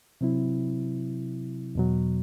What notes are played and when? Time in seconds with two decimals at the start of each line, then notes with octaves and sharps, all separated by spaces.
0.21 C3 F#3 C4 E4
1.75 E2 B2 F#3